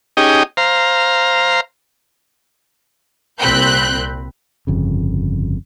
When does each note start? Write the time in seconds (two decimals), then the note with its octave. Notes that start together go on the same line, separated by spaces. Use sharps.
0.17 C#4 D#4 G4 G#4 D#5 G5
0.57 C5 F5 A#5
3.40 C2 A#2 C4 B5 F#6 G6
4.67 G1 F2 C#3